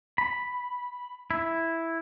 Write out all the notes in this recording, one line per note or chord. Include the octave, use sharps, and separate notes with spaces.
B5
E4